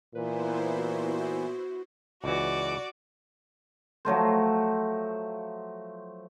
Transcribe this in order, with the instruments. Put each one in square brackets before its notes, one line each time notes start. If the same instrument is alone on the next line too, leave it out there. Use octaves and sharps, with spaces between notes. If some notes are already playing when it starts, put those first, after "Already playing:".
[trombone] A#2 [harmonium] E3 [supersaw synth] B3 E4 C5 [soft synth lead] B4
[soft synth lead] F#4
[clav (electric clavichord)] C#2 E3 [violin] F#4 D5
[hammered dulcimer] F3 F#3 A3 C5